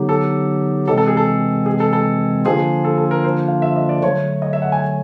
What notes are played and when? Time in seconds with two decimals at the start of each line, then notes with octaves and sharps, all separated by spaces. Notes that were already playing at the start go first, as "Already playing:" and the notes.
Already playing: D3 F#3 B3 D#4 G4
0.09 A4
0.88 C3 E3 G#3 C4 A4
0.98 A4
1.08 G#4
1.17 A4
1.66 G#4
1.80 A4
1.93 A4
2.45 D3 F3 A#3 D4 F4 G#4
2.84 A4
2.98 A4
3.11 A#4
3.24 C5
3.48 F5
3.62 E5
3.76 D#5
3.89 D5
4.03 D3 F#3 A3 C#5
4.42 D#5
4.53 E5
4.62 F#5
4.72 G#5